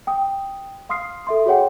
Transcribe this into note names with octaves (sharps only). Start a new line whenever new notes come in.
G5 D#6
F5 C6 D#6 F6 C7
A4 E5 C6
F#4 G#4 C#5 F#5 G5